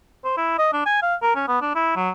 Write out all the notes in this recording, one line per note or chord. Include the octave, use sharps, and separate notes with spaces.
C5
E4
D#5
D4
G#5
F5
A#4
C#4
B3
D4
E4
F#3